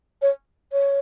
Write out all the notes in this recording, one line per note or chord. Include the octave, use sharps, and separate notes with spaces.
C#5
C#5